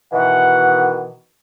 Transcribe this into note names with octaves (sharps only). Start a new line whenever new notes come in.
B2 D#3 E3 F#5